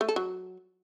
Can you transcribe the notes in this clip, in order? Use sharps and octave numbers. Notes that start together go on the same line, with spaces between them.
A3
A4
F#3